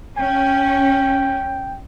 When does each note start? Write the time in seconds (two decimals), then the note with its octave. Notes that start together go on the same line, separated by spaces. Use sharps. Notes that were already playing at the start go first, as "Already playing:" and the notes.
0.17 C#4 G5